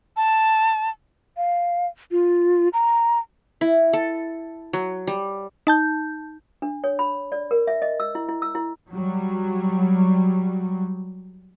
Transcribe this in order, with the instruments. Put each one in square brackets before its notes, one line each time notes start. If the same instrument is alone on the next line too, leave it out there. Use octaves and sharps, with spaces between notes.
[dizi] A5
[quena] F5
F4
A#5
[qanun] E4
A4
F#3
G3
[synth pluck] D#4 A5 G6
[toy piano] D4
C#5
B5
D5
A#4
E5
D#5
E6
E4
E4
E6
E4
[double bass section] F#3 G3